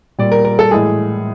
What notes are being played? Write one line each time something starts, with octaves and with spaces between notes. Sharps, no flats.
A#2 G3 D5
A#4
A#4
A4
A2 E3 G#3 G#4